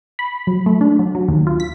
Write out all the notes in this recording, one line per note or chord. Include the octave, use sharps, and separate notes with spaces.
B5
F#3
A3
D4
F#3
F#3
D#2
F4
B6